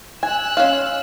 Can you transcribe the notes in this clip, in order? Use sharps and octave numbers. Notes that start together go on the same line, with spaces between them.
G#5 E6 F#6
C#4 F4 F5